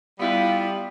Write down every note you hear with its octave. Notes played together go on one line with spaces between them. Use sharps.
G3 B3 E4 F4 B4